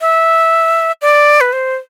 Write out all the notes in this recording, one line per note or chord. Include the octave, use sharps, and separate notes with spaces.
E5
D5
B4
C5